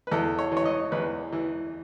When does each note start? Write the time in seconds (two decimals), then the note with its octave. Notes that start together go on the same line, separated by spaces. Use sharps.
0.07 B4
0.11 E2 A4
0.39 C#5
0.52 E3
0.57 C#5
0.65 D#5
0.92 E2 B4
1.32 E3